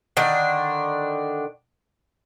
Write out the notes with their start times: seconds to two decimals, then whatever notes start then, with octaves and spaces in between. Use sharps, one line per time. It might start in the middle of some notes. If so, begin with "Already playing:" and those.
0.17 D3 D#3 D4